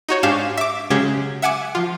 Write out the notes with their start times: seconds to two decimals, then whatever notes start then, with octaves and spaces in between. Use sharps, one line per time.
0.09 D#4 F#4 C#5
0.23 G#2 D4 G4 F5 G#5 E7
0.57 E5 D6
0.90 C#3 F#3 G#3 C#4 G4 G#4
1.42 E5 F#5 G#5 D6
1.75 F3 F4